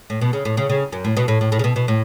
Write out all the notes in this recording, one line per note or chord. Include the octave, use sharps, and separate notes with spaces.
A2
B2
C#3
A2
C#3
C#3
F#2
A2
B2
A2
A2
A2
C#3
B2
B2
A2